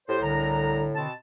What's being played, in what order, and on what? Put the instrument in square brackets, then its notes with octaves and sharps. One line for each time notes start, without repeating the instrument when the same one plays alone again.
[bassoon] A2 [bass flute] G4 [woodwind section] C5
[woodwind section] C2 A#5 [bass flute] D3
[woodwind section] B2 C4 A5